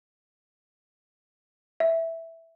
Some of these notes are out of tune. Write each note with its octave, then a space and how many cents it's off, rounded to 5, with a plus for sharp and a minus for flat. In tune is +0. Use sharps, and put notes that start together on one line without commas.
E5 +0